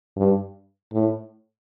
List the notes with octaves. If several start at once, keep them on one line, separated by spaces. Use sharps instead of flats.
G2
A2